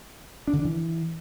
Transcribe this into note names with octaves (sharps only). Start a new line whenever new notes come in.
D4
D3
D4
E3